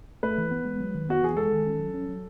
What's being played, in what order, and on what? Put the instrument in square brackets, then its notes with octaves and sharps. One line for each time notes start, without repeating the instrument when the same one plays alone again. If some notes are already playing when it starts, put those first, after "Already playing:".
[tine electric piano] A3 [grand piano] B4
[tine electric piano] E3
B3
G#3
F#3
D#3
[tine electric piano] B3 [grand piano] F#4
[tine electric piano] E3 [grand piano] G#4
[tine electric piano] G#3 [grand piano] A4
[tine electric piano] D#3
C#4
F#3
C#4
F#3